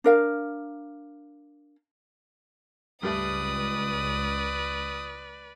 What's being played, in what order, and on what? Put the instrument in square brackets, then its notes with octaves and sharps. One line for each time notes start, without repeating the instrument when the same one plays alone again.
[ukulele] D4 A#4 F5
[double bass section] C#2 [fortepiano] G2 G3 A3 [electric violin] B4 D5 [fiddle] D#6